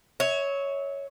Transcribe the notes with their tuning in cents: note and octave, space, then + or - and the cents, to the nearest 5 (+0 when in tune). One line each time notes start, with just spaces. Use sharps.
C#5 +5 E5 -30